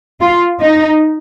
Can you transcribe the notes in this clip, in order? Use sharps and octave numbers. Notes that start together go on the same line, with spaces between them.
F4
D#4